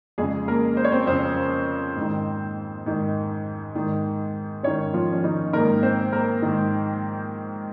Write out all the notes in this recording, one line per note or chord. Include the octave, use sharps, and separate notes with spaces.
F2 C#3 G#3 G#4
A#3 A#4
C5
C#5
C4 C5
F2 C#3 C4 C5
G#2
D#3
G#2 D#3
G#2 D#3
G#2 D#3 C#4 C#5
F3 F4
C#4
D#3 D#4
G#2 D#3 A#3 A#4
C4 C5
A#3 A#4
G#2 D#3